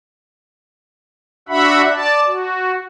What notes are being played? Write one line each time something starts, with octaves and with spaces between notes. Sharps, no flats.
D4 F#4 E5 F#5 B5
D5 A5
F#4